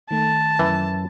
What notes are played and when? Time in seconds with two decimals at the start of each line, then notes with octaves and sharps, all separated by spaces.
0.11 D#3 A3 A5
0.59 F#2 E3